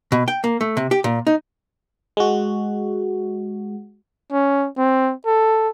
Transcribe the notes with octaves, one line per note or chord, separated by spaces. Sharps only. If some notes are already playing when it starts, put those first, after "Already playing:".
B2
G5
A#3
A3
C3
G4
A#2
D#4
G#3 F#4
C#4
C4
A4